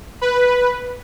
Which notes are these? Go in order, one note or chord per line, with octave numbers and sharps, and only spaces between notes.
B4